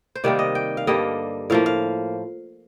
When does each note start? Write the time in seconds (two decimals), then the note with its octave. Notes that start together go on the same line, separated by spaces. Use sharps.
0.15 C5
0.24 C3 D#3 G3 A#3 D5
0.39 D#5
0.55 G5
0.77 F5
0.87 G2 D3 G3 A#3 D#5
1.50 A2 F3 A#3 F5
1.66 F5